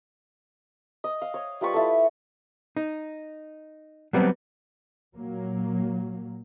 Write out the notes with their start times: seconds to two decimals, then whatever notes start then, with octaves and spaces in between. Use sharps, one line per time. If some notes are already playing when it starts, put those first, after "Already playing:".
1.04 D#5
1.22 F5
1.34 C#5
1.61 G3 F4 B4 C#6
1.74 E4 A4
2.77 D#4
4.13 F#3 G3 B3 C4
5.16 A#2 F#3 A#3